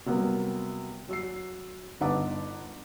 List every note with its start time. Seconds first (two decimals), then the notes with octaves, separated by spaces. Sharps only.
0.06 C3 F#3 G3 A#3 B3
1.09 F#3 E6 C7
2.01 G1 D#4 B4 F#5 A5 D6